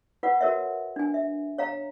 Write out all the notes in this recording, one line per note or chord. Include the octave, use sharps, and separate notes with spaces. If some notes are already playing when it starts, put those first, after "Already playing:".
F4 B4 F#5
F#4 A#4 C#5 E5
D4 G#5
E5
C#5 F5 A#5